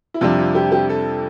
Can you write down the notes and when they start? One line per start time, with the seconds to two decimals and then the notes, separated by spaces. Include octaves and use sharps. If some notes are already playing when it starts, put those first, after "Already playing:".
0.14 E4
0.21 F2 C3 G3 D4 F4
0.38 F4
0.55 G4
0.72 G4
0.90 A4